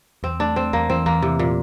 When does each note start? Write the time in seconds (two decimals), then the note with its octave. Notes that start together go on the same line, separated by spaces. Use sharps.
0.23 E2 C4
0.40 A3 D4
0.56 A3 C4
0.73 E2 A#3
0.90 E3 C4
1.06 E2 A#3
1.22 C3 E3
1.39 A#2